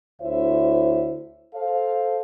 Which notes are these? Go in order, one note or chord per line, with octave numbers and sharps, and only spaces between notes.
D2 E4 C5 C#5 E5
A4 C5 F5